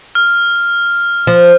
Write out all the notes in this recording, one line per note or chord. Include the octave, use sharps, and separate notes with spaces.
F6
F3